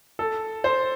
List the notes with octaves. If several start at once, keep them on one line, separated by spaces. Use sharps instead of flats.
A4
C5